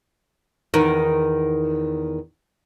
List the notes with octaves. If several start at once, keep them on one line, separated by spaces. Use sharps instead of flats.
E2 D#3